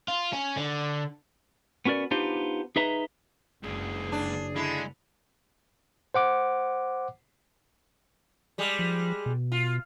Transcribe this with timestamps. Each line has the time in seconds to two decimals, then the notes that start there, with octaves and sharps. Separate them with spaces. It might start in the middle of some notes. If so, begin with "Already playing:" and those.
0.08 F4
0.33 C#4
0.57 D3
1.85 B3 C#4 F#4 A#4 D5
2.11 B3 D4 D#4 F4 G4 C5
2.76 D#4 G#4 B4 D#5 E5 A#5
3.63 F#1 C#2 D3 G#4
4.12 D4
4.56 D3 G#3 E4
6.14 C5 F#5 D6
8.58 G3 G#3
8.79 F3
9.26 B2
9.52 F4